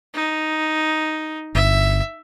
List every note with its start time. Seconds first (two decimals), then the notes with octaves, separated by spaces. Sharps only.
0.14 D#4
1.55 G1 E5